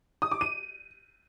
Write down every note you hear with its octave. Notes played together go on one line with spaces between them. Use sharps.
D#6
D6
D#7